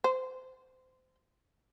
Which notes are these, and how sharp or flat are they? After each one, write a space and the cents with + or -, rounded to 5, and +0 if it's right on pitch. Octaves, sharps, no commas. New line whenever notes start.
C5 -25